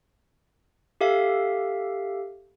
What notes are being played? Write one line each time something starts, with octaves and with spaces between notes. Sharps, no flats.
G4 A4 E5 F5